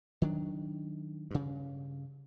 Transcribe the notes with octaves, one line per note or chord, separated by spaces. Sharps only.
D#3 F#3 D4
G2 C#3